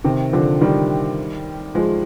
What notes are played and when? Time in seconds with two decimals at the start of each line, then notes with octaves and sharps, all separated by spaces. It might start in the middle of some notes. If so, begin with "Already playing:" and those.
0.04 C3 D#3
0.33 D3 F3
0.61 D#3 G3
1.75 F3 G#3